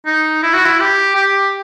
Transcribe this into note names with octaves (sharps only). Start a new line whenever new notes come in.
D#4
E4
F#4
E4
G4
G4